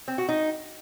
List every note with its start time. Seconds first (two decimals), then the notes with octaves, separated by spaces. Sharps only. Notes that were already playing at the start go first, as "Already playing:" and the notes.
0.08 C4
0.18 F#4
0.29 D#4